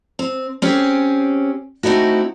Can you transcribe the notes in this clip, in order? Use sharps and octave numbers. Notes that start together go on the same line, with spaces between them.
C4
C4 C#4 G4 G#4
A3 C4 D#4 E4 F#4